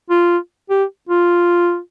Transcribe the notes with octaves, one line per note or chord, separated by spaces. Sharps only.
F4
G4
F4